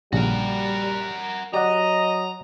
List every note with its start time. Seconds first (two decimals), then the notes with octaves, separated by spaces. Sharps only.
0.13 A#1 C#3 G3 F#4 A#4
1.54 F#3 G4 D5 D#5 F#5 A#5